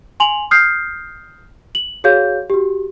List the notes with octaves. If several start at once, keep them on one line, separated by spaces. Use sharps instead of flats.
G#5 C6 F7 F#7
D#6 F6 G6 C7
F#7
F#4 G#4 C#5 F5 G6
F#4 G4